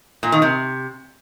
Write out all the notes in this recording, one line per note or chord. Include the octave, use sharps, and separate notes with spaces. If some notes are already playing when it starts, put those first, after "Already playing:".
A#2
D#3
C3